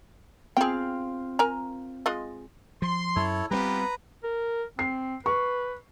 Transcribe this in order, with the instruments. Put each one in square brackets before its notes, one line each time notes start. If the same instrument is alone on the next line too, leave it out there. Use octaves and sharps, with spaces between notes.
[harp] C4 F4 F5 [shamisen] G#4 G5
[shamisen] A#4 G#5 A#5
G#3 F4 D#5
[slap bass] F3 [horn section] C6
[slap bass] F#2 [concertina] E4 A4 C#5
[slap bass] G3 A3 C4 [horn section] B3 F4 G4 [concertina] B4 A#5
[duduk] A#4
[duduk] C4 [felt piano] C7
[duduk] B4 [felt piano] C#6